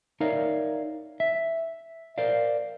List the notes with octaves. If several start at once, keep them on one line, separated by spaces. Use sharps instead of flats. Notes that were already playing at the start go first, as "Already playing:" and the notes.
D#4 A#4 C#5 D5 E5 F5
E5
A#4 C5 D5 F5